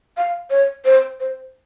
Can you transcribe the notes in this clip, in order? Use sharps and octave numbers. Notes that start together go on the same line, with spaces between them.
F5
C#5
C5
C5